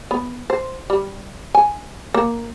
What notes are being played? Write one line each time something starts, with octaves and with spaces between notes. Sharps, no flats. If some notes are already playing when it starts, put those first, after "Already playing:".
B3
C5
G3
G#5
A#3